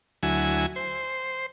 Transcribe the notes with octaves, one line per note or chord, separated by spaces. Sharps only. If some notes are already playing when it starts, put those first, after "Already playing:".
D2 F#3 E4 G#5
C5